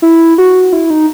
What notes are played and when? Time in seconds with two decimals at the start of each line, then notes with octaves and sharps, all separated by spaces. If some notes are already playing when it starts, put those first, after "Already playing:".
0.02 E4
0.38 F#4
0.73 E4
0.90 D#4